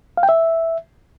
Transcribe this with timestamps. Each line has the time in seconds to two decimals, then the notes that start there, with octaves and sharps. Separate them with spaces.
0.17 F5
0.23 G5
0.29 E5